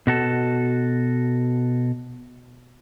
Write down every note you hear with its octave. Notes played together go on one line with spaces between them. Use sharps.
B2 F#4 A4